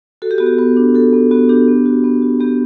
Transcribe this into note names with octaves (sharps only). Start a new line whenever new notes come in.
F#4 A4
G4
B3 F#4
G4
B3
D4
F#4 A4
B3
B3 F#4
D4 G4
B3
F#4
B3
F#4
B3 G4